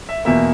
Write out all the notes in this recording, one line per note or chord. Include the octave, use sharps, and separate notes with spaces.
E5
E2 B2 A#3 E5